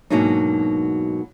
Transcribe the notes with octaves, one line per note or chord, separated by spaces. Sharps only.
G#2 B2 F#3 A#3 D4 D#4